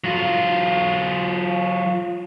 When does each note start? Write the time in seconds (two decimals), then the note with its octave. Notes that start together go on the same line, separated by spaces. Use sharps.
0.04 F#3 F4